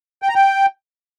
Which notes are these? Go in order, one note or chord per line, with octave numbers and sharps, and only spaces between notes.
G5
A#5
G5